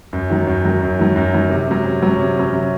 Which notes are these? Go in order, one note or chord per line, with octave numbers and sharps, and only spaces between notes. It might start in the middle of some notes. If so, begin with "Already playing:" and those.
F#2
D#3 F#3
F#2
D#3 F#3
F#2
D#3 F#3
F#2
D#3 F#3
C3
F#3 C#4
C3
F#3 C#4
C3
F#3 C#4
C3